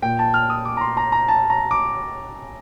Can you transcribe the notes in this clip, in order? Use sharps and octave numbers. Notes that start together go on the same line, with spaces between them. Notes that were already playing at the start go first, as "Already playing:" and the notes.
A#2 G5
A5
F6
D#6
D6
A#5
C6
A#5
A#5
A5
A#5
D6